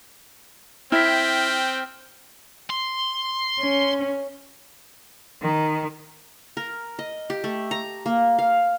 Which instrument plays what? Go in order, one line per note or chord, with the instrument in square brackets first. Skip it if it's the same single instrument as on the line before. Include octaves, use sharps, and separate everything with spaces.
[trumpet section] C4 G5 [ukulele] E4 [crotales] F6 B6
[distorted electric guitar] C6
[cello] C#4
[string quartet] D#3
[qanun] A#4
D#5
G4
A3
A#5
A#3
F5